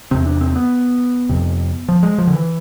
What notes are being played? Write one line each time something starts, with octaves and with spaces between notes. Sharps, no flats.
E2 C3 C4
D4
C4
B3
F2 C3
F3
G#3
F3
D3
E3